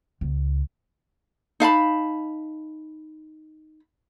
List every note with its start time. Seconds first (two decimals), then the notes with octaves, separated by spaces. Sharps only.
0.21 C#2
1.60 D#4 F5 A5 B5